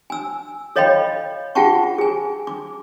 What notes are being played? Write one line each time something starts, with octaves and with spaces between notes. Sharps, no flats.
G#5 E6
A4 C#5 D#5 F5 G5 B5
F4 G#4 F#5 G5 A5 C#6
G#4 G#5
D6